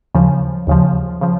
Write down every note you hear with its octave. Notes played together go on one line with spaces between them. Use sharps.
D#2 C#3 F3
D#2 C#3 F3
C#3 F3